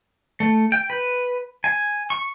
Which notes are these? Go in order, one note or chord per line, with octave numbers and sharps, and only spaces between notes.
A3
G5
B4
G#5
C#6